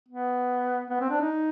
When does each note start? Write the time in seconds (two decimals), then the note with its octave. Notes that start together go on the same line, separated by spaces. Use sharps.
0.08 B3
0.90 B3
1.00 C4
1.10 D4
1.21 D#4